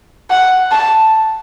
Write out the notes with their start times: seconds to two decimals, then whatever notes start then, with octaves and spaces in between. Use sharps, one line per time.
0.30 F#5
0.72 A5